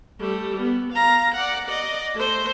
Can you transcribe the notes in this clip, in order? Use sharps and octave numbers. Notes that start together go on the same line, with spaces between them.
G3 A3
B3
F5 A#5
D5 F#5
D5 D#5
A3 C5